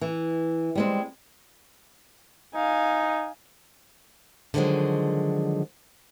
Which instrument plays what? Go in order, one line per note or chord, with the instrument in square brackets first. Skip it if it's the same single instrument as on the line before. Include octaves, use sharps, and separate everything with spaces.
[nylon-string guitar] E3
G3 G#3 C4
[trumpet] D#4 [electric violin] F5 G#5
[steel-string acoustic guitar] D3 D#3 F3 F#3 G#3